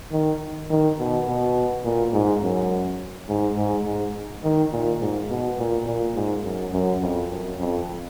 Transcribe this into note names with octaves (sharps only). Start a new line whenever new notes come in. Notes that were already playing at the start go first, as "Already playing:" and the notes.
D#3
D#3
B2
B2
A#2
G#2
F#2
G#2
G#2
G#2
D#3
A#2
G#2
B2
A#2
A#2
G#2
F#2
F#2
F2
F#2
F2